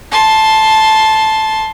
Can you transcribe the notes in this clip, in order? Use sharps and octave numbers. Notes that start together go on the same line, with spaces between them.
A5 C6